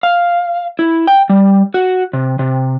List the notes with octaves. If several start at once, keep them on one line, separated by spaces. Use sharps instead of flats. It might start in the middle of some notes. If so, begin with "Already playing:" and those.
F5
E4
G5
G3
F#4
C3
C3